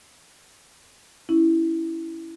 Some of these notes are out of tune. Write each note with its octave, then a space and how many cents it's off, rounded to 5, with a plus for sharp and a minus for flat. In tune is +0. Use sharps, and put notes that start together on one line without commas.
C#4 +0 E4 -5